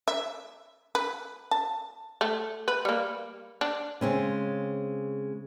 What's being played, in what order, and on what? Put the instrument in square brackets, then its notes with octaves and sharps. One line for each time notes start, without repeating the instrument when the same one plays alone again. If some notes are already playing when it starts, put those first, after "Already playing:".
[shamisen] E5
B4
A5
A3
B4
G3 A#3
D4
[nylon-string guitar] C#3 G#3 C4 C#4